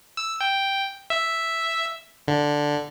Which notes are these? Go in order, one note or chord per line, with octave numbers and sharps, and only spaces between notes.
E6
G5
E5
D3